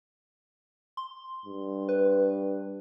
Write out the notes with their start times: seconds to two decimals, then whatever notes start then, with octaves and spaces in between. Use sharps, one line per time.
0.97 C6
1.46 G2
1.89 B4